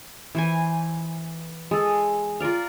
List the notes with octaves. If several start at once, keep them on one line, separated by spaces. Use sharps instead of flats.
E3 C5 G#5
G#3 A4
F4 A#4 D5 F5